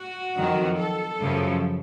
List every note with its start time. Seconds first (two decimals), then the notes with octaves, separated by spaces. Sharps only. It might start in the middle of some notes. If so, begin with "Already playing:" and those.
Already playing: F#4
0.36 F2 D#3 F#3
0.78 A4
1.20 F#2 C#3 F3